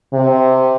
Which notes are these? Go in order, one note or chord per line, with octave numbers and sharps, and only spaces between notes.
C3